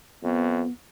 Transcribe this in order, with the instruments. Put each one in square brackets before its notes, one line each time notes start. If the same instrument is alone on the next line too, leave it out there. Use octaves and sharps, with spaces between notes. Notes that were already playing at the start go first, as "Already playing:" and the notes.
[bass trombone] F2 [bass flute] B3